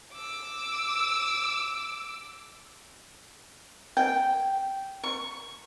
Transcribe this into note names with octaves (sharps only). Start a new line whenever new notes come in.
D6 E6
G5
C#6